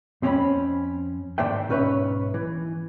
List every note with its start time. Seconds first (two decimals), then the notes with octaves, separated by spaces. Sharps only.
0.22 F2 C4 C#4 C#5 G5 B5
1.38 G#2 D#3 D4 C5 E5 G5
1.69 B1 G#2 C#4 B4 C#5 E5
2.34 E3